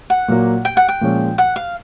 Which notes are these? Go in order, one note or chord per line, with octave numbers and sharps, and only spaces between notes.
F#5
A#2 F#3 A#3
G5
F#5
G5
A#2 F3 G#3 C#4
F#5
F5